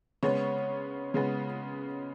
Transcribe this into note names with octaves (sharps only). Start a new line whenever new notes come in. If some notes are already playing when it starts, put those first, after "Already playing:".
C#3 G#3 B3 C#5
C#3 G#3 B3